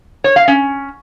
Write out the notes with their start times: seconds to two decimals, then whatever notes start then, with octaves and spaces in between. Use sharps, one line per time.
0.24 C#5
0.36 F5
0.48 C#4